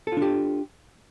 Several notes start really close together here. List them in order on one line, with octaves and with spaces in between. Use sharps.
A4 F4 D4 G4